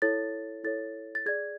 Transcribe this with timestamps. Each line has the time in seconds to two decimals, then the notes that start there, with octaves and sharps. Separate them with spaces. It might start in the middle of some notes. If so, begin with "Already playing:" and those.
0.02 E4 A4 C#5 A6
0.63 E4 A4 C#5 A6
1.15 A6
1.26 G#4 D5 G#6